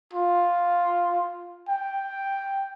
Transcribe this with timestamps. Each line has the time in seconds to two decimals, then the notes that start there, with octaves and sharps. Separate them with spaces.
0.13 F4
1.69 G5